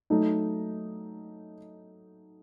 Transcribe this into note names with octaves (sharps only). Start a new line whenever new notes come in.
F#3 A3 D#4